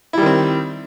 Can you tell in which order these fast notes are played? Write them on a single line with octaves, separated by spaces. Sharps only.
E4 G3 D#3 C4